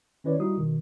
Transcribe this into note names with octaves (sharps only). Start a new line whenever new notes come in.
D#3 C#4 E4 B4 C#5 D5
G3 D#4 E4 F#4 D#6
B2 D#3